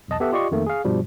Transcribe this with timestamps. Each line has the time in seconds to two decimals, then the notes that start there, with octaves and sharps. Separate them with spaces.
0.08 B1 E2 D#5 A5
0.20 B3 G4 A4 E5 F#5
0.32 F4 G4 D5 D#5 C6 C#6
0.51 F2 D#3 A3 A#3
0.66 G#4 F5
0.85 G2 B2 F3 G3